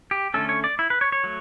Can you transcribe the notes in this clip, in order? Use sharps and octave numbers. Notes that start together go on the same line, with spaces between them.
G4
D3 A3 C#4 A4
C#5
D5
E4
B4
C#5
C#5
F#3 A3